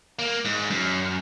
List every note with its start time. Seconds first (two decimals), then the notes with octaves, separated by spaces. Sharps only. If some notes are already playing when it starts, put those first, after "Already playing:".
0.19 A#3
0.45 G#2
0.71 F#2